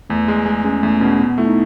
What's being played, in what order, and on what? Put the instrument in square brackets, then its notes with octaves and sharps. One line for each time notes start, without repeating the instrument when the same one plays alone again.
[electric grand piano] E2 [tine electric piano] A3
[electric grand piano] G#3
G#3
[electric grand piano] G#3 [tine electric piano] C#4
[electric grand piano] E2 [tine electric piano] A3
[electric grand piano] B2 [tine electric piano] C#4
[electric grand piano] B2 [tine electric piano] B3
[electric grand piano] A3 [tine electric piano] E4
[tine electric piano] D#4